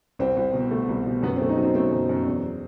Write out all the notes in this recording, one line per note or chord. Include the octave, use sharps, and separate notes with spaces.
C2 C4
C2
B2
A3
C2
B2
F#2 B3
C4
A3
D#4
F#3
C4
A3 C4
F#2
F#2
E2